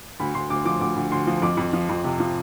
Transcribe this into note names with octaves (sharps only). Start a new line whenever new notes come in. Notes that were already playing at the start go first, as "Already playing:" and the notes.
D2 B5
D2 C6
D2 D6
F3 D6
D2 D6
D2
D2 C6
F3
F2 D6
F2
F3
F2
C3
F3